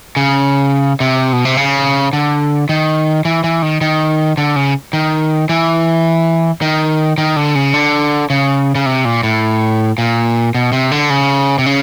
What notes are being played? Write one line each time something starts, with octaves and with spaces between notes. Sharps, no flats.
C#3
C3
B2
C3
C#3
D3
D#3
E3
E3
D#3
D#3
D3
C#3
D#3
E3
D#3
D#3
D3
C#3
D3
C#3
C#3
C3
A#2
A2
A#2
B2
C3
D3
C#3
C3
C#3